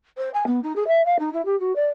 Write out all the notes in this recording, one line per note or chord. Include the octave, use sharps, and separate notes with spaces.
C5
G#5
B3
D#4
G#4
E5
F5
D#4
E4
G4
F#4
D5